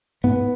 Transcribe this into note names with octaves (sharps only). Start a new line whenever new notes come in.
G#2 B3